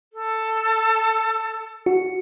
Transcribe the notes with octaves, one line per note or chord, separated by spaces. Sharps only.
A4
F#4